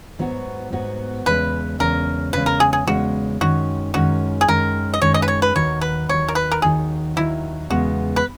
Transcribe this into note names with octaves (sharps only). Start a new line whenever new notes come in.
G#2 F#3 B3 F#4
G#2 F#3 B3 F#4
E2 C#3 G#3 C#4 B4
E2 C#3 G#3 C#4 A#4
E2 C#3 G#3 C#4 B4
A#4
G#4
G#4
E2 C#3 G#3 C#4 F#4
F#2 D#3 G#3 C#4 F#4
F#2 D#3 G#3 C#4 F#4
G#4
F#2 D#3 G#3 C#4 A#4
D#5
F#2 D#3 G#3 C#4 C#5
D#5
B4
C#5
B4
D#2 D#3 F#3 C#5
B4
D#2 D#3 F#3 C#5
A#4
B4
A#4
D#2 D#3 F#3 G#4
D#2 D#3 F#3 E4
E2 C#3 G#3 B3 F#4
B4